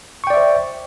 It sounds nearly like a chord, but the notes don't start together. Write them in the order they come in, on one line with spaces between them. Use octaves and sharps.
C#6 G5 D5 E5 C5